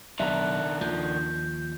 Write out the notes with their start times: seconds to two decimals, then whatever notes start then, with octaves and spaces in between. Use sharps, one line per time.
0.20 B1 D#3 D4 E5 A#5 F#6
0.81 D#2 F3 G6